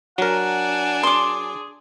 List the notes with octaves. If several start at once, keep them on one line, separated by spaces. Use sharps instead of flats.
F#3 D4 A#4 F#5 G#5
G#4 C6 D6